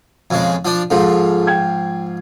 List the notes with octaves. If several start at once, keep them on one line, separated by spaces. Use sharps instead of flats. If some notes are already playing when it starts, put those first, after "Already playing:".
F2 C#3 G#3
F3 D4
G#2 F3 F4 G#4 A4
G5 G#6